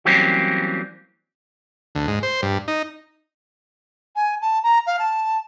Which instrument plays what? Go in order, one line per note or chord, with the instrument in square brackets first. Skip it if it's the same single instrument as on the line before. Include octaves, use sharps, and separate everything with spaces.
[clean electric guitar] E3 F#3 G3 A#3 C4 C#4
[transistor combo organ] D2
G#2
C5
G2
D#4
[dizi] G#5
A5
A#5
F5
A5